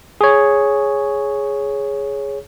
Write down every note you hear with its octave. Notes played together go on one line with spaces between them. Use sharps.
G#4 C#5